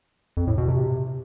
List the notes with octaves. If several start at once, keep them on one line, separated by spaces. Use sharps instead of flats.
F2
A2
B2
C3